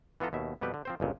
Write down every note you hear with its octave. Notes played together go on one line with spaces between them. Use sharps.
E3 B3 F4 A4 A#5
D#2 B2 E5
F2 B2 G3 G4 B4
D3
F3 C4 C5
G1 C#2 A#2